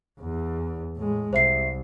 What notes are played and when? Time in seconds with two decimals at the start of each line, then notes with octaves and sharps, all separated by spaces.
0.21 E2
0.96 A2 G#3
1.33 C2 C5 E5 C7